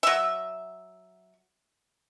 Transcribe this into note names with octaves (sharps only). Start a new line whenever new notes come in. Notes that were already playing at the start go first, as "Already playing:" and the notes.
F#3 E5